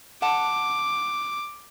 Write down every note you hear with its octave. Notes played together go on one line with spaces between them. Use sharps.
F#5 A5 D6